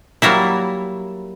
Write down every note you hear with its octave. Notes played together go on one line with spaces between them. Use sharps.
F#3 G3 A#3 E4